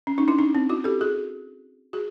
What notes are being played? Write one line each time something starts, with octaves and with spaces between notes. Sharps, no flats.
C#4
C#4 D#4
D4 E4
C#4 D#4
C4
E4 F#4
G4 A4
F#4 G#4
F#4 G#4